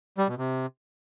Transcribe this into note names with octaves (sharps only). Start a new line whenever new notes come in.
G3
B2
C3